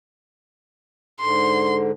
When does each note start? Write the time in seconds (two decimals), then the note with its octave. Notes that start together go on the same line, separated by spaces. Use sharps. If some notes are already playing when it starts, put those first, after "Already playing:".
1.20 G#2 D3 C6